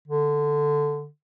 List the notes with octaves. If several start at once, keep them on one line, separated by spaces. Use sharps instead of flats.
D3